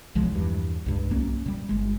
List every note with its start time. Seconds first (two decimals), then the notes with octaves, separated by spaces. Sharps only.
0.15 B1 F3 G#3
0.31 E2 G2
0.86 C#2 G2
1.10 B1 A#3 C#4
1.46 A#2 G3
1.69 G1 G#3